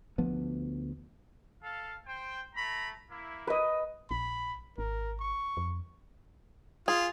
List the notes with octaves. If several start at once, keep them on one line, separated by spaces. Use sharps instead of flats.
D2 F3 B3
A4 F5
C5 G5
A3 A#5 B5
A#3 E4
B4 D#5
A#1 B5
G#1 A#4
C#6
F2
F4 G#4